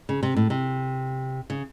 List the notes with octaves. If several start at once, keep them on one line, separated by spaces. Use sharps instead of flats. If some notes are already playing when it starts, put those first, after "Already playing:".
C#3
C3
A2
C3
C#3